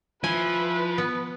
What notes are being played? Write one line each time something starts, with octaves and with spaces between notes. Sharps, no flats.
F3 E4 B4 G#5
B3 B4